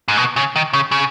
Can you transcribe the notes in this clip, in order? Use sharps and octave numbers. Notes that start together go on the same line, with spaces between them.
G#2
B2
C#3
D#3
C#3
C#3